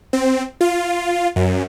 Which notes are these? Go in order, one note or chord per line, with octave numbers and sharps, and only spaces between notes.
C4
F4
F#2